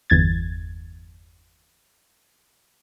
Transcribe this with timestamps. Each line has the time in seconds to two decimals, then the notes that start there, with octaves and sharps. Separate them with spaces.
0.10 G1 E2 G#6 A6